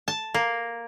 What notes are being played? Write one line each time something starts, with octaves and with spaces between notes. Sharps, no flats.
A5
A#3